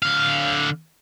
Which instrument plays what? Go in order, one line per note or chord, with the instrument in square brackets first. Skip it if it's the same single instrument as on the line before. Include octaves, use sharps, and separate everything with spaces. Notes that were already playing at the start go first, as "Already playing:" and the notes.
[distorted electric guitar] D3 F5